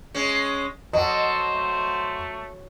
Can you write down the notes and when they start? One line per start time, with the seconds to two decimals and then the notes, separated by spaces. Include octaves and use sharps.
0.14 G#3 C#4
0.93 F#3 A4 C5 D#5 F#5
1.53 A3